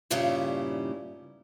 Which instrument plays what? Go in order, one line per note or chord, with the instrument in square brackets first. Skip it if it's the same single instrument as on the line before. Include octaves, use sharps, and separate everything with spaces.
[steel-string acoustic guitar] G2 A#2 C#3 G3 D#4 E4